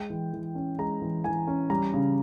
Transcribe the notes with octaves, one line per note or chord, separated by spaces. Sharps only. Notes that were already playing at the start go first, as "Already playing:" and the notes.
Already playing: G#3 G5
E3
E3
C#4
G#3 A#5
E3
E3 G#5
C#4
G3 A#5
C#3